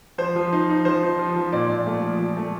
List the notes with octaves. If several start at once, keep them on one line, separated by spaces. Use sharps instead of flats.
F3 C5
F3
D#4
D#4
F3 C5
D#4
F3
F3
A#2 D5
A#2
A3
F3
F3
A3